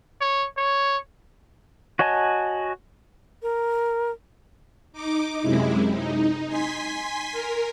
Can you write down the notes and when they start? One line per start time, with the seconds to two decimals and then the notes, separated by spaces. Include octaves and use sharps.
0.21 C#5
0.57 C#5
1.99 F#4 C#5 D#5 G#5 A5
3.43 A#4
4.93 D#4 D6
5.41 F#2 C3 G#3 E4
5.92 D#4
6.47 G#5 C6 B6
7.31 A#4